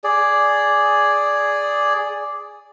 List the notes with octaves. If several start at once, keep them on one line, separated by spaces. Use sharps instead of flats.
G#4 D5